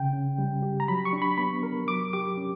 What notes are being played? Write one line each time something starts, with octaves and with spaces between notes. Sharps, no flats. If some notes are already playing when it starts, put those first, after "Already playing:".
Already playing: C#3 G5
C#4
G3
G4
A#5
F#3 B5
C#6
D4
B5
B3 B5
A#4
F#3 D6
G4 D6
C#4